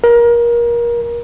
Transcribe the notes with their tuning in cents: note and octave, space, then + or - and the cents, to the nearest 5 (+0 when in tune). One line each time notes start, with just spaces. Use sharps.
A#4 +25